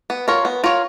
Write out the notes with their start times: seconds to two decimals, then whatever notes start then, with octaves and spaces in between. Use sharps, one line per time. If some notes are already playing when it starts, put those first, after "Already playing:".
0.10 B3
0.28 F4 A#4 C#5
0.45 B3
0.64 F4 A#4 C#5